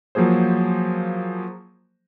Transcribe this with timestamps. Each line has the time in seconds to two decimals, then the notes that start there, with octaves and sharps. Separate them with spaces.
0.15 F3 F#3 A#3 G#4 C5